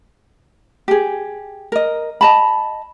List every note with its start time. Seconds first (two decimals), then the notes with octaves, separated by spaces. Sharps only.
0.88 G4 G#4
1.72 A#4 D#5
2.21 D#5 A5 B5